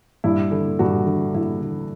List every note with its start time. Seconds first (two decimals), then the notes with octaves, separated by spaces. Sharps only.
0.24 G2 E4
0.51 D3
0.79 G2 F#4
1.06 D3
1.34 G2 E4
1.61 D3